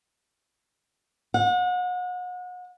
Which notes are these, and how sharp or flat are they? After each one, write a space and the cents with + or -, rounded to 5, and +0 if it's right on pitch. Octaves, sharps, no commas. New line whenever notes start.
F#5 -35